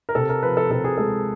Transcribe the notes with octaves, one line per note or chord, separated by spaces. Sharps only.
A#4
C3 A4
A#4
F3 B4
A4
C3 A4
G#4
G#3 A4